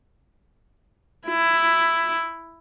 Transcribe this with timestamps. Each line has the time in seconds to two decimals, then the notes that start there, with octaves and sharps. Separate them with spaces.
1.27 E4